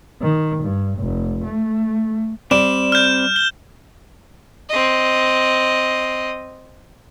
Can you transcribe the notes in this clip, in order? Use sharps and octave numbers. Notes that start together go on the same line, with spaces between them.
D#3
G2
F1
A3
G3 C4 C5 D5 E7
F6 G6
G7
C4 D#5